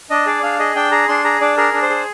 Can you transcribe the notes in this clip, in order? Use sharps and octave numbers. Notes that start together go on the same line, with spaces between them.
D4 D#5
G#4 D5
D4 F5
G#4 D#5
D4 G5
G#4 A#5
D4 C6
G#4 A#5
D4 D5
G#4 A#4
D4
C5
G#4